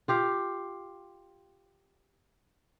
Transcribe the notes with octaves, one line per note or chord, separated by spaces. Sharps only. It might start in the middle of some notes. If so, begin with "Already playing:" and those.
F4 G4 F5